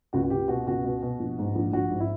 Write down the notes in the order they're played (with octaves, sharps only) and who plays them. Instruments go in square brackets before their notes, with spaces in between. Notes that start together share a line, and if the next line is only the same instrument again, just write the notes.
[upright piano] C#2 F#4
F#4
C#2 G4
B2 F#4
C#2 F#4
B2
B2
A#1
G#2
A#1
A#1 F#4
G#2
E4